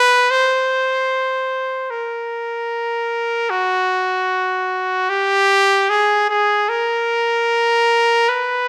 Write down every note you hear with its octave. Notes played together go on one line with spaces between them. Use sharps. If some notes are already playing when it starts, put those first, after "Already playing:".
Already playing: B4
C5
A#4
F#4
G4
G#4
G#4
A#4
B4